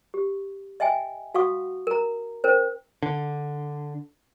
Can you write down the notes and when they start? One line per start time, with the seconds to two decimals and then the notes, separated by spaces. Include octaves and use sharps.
0.14 G4
0.80 D#5 E5 G5 G#5
1.34 F#4 F5 F#5 C#6 D#6
1.87 A#4 A#5
2.44 C#4 A#4 C5
3.03 D3